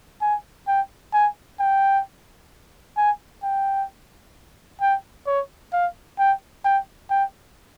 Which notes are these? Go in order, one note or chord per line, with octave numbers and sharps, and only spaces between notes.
G#5
G5
G#5
G5
G#5
G5
G5
C#5
F5
G5
G5
G5